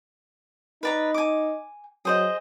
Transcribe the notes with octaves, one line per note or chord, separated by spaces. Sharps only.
D#4 B4 D5 A#5
G#5 D6
F#3 G#4 C5 D#5